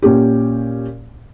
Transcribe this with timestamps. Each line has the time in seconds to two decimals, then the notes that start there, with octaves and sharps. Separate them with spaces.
0.02 A#2 C#4 G4